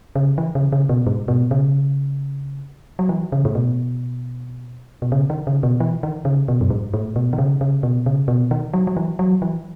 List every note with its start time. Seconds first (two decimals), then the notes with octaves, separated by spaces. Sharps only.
0.16 C#3
0.38 E3
0.55 C#3
0.72 C#3
0.89 B2
1.07 G#2
1.28 B2
1.51 C#3
2.99 F#3
3.09 E3
3.32 C#3
3.45 A2
3.55 B2
5.02 B2
5.12 C#3
5.30 D#3
5.47 C#3
5.63 B2
5.80 E3
6.03 D#3
6.25 C#3
6.48 B2
6.61 F#2
6.70 G#2
6.94 A2
7.16 B2
7.33 D#3
7.38 C#3
7.61 C#3
7.83 B2
8.06 C#3
8.28 B2
8.51 D#3
8.73 F#3
8.87 F#3
8.97 E3
9.19 F#3
9.42 E3